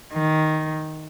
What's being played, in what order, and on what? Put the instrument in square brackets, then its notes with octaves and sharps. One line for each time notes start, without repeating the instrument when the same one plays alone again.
[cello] D#3